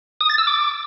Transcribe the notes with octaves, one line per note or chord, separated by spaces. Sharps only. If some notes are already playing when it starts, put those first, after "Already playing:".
D#6
A6
E6
D6